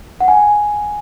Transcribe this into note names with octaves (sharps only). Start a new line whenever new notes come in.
F#5
G#5